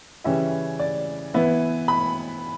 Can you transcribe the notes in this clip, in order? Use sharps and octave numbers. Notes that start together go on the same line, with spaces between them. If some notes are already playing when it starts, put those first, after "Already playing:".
C#3 E3 G3 C#4 E4 E5
D5
E3 B3 E4
B5